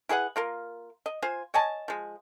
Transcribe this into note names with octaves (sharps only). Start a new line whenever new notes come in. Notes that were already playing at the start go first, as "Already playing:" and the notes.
E4 G#4 B4 F#5
A#3 F4 A#4
D#5
F4 C5 G#5
C#5 D#5 G#5 A5
F3 G#3